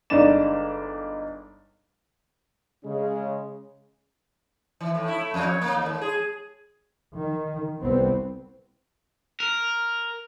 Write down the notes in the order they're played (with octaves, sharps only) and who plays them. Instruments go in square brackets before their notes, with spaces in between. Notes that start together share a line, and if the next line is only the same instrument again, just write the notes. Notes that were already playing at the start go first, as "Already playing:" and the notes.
[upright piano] G1 G#3 D4 D#4 D5 E7
[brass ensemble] C#3 [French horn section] G#3 C#4
[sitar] E3
A2
E4
A3
F2
C#5
A#3
D#2
G#2
G#4
[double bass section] D#3
C2 B3 C4
[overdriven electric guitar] A#4